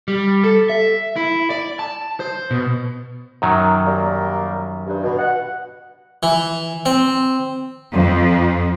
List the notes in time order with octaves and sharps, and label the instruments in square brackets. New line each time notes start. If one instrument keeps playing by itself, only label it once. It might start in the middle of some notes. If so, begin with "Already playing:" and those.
[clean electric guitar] G3
A4
E5
E4
D5
A5
C5
B2
[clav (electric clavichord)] F#2 D#3 F#3
[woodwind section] G3 A#3
G2
B2
F#5
[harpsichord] E3
C4
[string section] F2